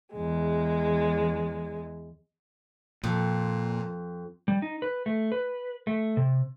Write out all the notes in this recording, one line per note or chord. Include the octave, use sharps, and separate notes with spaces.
E2 G#3
F2 A#2
G3
D#4
B4
A3
B4
A3
C3